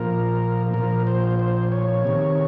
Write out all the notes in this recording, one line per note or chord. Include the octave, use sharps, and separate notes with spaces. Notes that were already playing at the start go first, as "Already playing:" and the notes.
Already playing: A#2 F3 A#4
A#2 F3 A#4
C5
C5
C#5
C3 D#3